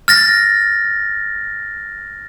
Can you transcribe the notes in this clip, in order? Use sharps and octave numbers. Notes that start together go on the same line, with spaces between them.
F6 A6 A#6